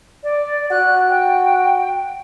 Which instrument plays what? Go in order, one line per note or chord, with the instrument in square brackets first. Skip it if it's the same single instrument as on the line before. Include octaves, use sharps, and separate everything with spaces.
[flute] D5
[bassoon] F#4 [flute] F#6
[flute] G5